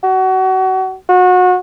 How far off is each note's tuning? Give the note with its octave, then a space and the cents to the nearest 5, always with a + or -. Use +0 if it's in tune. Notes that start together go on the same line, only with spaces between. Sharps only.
F#4 +30
F#4 -30